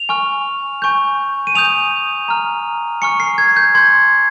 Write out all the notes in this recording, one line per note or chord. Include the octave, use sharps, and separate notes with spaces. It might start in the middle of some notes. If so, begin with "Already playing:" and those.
Already playing: F7
G#5 C#6 F6
G#5 C#6 G6
D#7
G#5 D#6 G6 F7
A#5 F6
G#5 C#6 F6 C#7
C7
G#6
G6
C6 G6 G#6